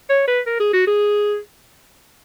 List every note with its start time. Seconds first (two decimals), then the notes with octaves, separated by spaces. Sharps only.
0.10 C#5
0.27 B4
0.46 A#4
0.60 G#4
0.73 F#4
0.87 G#4